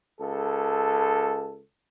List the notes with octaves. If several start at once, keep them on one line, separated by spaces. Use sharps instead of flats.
C#2 A4